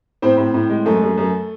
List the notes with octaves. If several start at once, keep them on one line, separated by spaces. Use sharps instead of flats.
A2 C4 C5
A2
A2
G#3
F#2 A3 A4
F#2
F#2